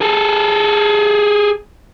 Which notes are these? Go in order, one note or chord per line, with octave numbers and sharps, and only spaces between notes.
G#4 A4